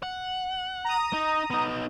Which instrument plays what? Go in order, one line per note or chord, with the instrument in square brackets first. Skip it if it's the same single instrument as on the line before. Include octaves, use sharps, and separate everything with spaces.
[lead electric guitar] F#5
[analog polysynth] A#5 D#6
[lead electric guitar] D#4
B3 D#4